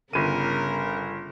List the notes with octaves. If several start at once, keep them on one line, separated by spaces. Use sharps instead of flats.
G1 C#3 A#4 D#7